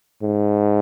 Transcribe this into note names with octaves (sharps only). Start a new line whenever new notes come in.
G#2